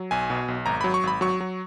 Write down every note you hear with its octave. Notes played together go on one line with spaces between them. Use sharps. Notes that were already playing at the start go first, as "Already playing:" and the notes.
Already playing: F#3
B1 G#5
B2
B1
G#1 A#5
F#3 B5
C#6
G#1 B5
F#3 C#6
F#3